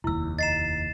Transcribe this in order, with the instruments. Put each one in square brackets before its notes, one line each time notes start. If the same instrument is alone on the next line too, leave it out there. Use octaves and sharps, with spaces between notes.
[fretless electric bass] F1 D#2 [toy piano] E4 E6
[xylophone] D#5 A#5 [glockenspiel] A6 C7 E7